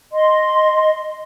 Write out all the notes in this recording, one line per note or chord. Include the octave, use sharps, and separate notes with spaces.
D#5 C6